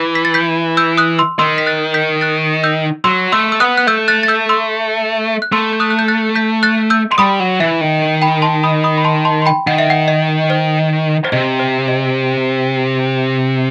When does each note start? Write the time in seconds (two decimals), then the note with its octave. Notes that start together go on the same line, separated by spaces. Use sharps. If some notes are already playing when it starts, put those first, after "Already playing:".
Already playing: E3
0.15 B6
0.25 A6
0.34 G6 B6
0.77 E6 G6
0.97 D#6 F#6
1.19 C6 E6
1.39 D#3 C6 E6
1.58 B6
1.66 F#6 A6
1.94 G6 B6
2.21 F#6 A6
2.63 E6 G6
3.04 F#3 C6 E6
3.32 A3 C6 E6
3.52 E6
3.60 B3 D#6 F#6
3.77 F#6
3.87 A3 E6 G6
4.08 F#6 A6
4.23 A6
4.28 E6 G6
4.49 C6 E6
5.42 F#6
5.52 A3 C6 E6
5.73 G6
5.80 D#6 F#6
5.90 F#6
5.99 G6
6.08 F#6 A6
6.35 G6 B6
6.63 F#6 A6
6.90 E6 G6
7.12 C6
7.18 G3 B5 D#6
7.40 F#3
7.60 E3 E5
7.81 D#3
8.22 G5 B5
8.42 A5 C6
8.63 B5 D#6
8.84 B5 D#6
8.98 B5
9.04 A5 C6
9.25 A5 C6
9.42 C6
9.46 G5 B5
9.67 D#3 F#5
9.78 E5
9.90 F#5
10.08 D#5
10.50 C5
11.25 C5
11.32 C3 D#5
11.60 C5
11.88 D#5